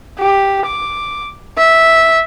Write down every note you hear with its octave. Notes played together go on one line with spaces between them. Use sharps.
G4
D6
E5